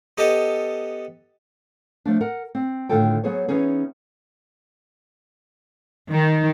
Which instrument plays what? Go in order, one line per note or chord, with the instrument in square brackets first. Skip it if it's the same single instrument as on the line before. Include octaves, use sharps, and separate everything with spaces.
[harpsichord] B3 G4 A4 D#5
[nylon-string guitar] F3 A3 D4
A#4 F#5
C4
A2 D3 D#3 F4 A4 G5
F#3 B3 G#4 C5 C#5
E3 B3 C#4 D#4 G#4
[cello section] D#3